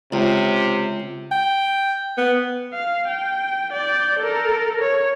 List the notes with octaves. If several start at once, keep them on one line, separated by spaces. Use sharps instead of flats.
C#2 C3
G5
B3
F5
G5
D5 G6
A4 A#4
C#5